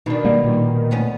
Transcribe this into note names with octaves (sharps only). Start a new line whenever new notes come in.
B2 D#3 D4
G3 A#3
A#2
D2 B3 C#4